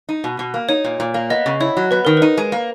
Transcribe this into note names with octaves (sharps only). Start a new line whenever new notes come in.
D#4
B2
B2
A#3
D#4 C#5
A#2
A#2
A#3
B3 D#5
C#3
E4 C#5
F#3
B3 B4
D#3 A#4
D#4 B4
G#3
A#3